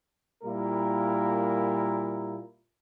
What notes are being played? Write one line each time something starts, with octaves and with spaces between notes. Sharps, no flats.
A#2 G3 A#3 E4 A#4